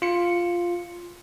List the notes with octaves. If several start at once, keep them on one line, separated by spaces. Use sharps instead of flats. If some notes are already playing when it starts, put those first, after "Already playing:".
F4 C#7